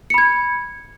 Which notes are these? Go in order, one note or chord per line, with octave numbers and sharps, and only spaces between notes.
B5 G#6 C#7